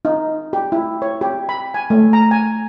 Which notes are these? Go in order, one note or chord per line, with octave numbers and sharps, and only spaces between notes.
D#4
G4
E4
C#5
G4
B5
G#5
A3
A#5
G#5